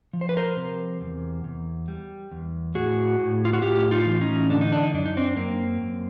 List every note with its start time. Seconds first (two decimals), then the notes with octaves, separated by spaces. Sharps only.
0.13 F3
0.21 C5
0.29 B4
0.37 A#4 C5
0.57 C3
1.01 E2
1.44 E2
1.88 G3
2.31 E2
2.75 A2 F#4 G#4
3.19 A2
3.45 F4
3.53 F#4
3.62 A2 F4 G4
3.91 D#4 F4
4.06 E3
4.21 C#4 D#4
4.50 D3 D4
4.61 D#4
4.72 D4
4.83 D#4
4.93 F#2 D4
5.06 D#4
5.17 C4 D4
5.36 F#2 A#3 C4
5.81 F#2